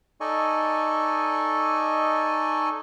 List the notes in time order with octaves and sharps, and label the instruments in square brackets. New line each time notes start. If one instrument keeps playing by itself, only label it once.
[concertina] D#4 A4 D5 D#5 G#5 C#6